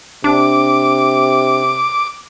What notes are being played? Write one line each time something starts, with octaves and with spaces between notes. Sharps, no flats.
C3 D4 D6